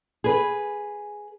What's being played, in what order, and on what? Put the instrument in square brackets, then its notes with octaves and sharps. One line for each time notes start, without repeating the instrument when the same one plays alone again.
[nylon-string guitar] G#4 B4